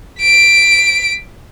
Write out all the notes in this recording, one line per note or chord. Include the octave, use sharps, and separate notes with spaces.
B6 D7